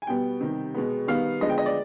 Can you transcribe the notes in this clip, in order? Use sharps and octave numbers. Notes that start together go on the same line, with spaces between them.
G#5
B2 G3 B3 G5
C3 D#3 G3
B2 G#3 B3
D#3 G3 B3 F5
D3 F3 G#3 B3 D#5
G5
D#5
D5